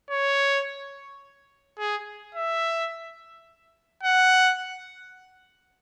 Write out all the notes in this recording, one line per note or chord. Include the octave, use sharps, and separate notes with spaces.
C#5
G#4
E5
F#5